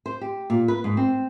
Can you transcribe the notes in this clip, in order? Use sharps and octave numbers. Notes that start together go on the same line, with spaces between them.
C5
G4
A#2
B4
G#2
C4